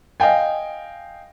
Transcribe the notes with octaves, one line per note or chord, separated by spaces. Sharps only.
D#5 F5 G5 G#5